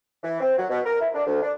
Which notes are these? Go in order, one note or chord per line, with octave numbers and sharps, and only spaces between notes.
E3
C4
F#3
B2
A#4
E4
D4
D2
D4